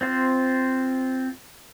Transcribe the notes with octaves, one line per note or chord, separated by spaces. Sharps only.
C4 F4 C5